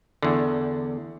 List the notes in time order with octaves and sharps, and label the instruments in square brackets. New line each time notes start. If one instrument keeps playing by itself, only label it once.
[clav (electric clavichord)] E2 D3